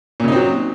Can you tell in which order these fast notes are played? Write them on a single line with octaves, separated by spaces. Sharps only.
A#2 C#3 D#4 C4 F#3